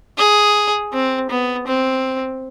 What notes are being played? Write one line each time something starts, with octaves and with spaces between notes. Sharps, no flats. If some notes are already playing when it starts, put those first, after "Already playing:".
G#4
C4
B3
C4